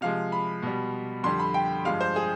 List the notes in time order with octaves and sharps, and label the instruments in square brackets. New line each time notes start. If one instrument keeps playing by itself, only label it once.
[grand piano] C3 F3 G#3 F5
B5
B2 G3
F2 D3 G3 C6
B5
G5
G2 F3 G#3 F5
C5
G#4